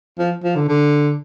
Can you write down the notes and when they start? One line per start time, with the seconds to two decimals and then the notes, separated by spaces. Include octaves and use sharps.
0.19 F3
0.43 F3
0.56 D3
0.68 D3